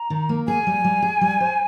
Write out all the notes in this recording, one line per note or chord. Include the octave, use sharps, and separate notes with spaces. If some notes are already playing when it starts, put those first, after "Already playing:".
Already playing: A#5
D#3
A#3
G#4 G#5
G3
G3
G#4
G3
C5